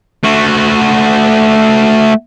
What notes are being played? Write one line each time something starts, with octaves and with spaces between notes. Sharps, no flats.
A3 F#4